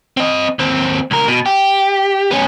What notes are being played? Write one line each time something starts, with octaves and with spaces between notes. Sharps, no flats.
C4 D#5
D#2 C4
C#2 A#4
B2
G4
B3 C#4